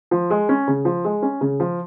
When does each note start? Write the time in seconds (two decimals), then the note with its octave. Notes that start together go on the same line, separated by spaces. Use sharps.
0.11 F3
0.30 G#3
0.49 C#4
0.68 C#3
0.85 F3
1.05 G#3
1.22 C#4
1.41 C#3
1.60 F3